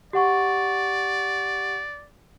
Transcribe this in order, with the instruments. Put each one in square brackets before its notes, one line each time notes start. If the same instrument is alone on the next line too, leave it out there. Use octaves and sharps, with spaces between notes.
[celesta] G4 F#5 C#6 [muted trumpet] D5